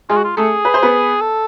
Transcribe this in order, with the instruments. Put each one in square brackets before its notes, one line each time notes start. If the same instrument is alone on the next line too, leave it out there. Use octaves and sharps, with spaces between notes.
[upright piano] G#3 G#4 [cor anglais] F4
[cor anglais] F#4
F4
[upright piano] A3 A4 [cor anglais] G#4
[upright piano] B4
C5
B3 B4
[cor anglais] A4